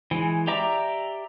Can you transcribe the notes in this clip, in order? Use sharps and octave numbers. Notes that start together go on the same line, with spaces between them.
E3 G#3
G4 D5 E5 A#5 D6